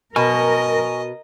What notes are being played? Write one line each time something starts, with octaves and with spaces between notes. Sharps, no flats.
B2 A#4 D#5 G#5 C#6 F6